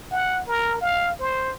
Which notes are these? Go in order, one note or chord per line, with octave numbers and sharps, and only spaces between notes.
F#5
A#4
F5
C5